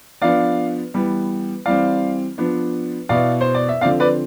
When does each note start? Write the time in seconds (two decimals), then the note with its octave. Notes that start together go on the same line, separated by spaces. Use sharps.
0.22 F3 B3 D4 D5 F5
0.94 E3 G3 B3
1.66 E3 G3 C4 D5 F5
2.38 F3 B3 D4
3.09 B2 B3 E4 D5 F5
3.41 C5
3.54 D5
3.69 E5
3.81 D3 F3 C4 D5 F5
4.00 B4 D5